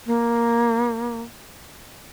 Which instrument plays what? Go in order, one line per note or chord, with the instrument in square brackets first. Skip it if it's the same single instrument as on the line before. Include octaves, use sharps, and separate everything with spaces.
[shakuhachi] A#3